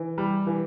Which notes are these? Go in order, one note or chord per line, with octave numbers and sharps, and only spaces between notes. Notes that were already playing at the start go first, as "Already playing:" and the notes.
Already playing: E3
G3
E3